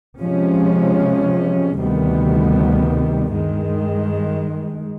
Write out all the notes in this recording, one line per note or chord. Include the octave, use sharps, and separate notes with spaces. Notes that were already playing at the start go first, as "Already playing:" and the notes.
C3 F3 G#3 C#4
D2 C3 D#3 G3 B3
G2 D#3 G#3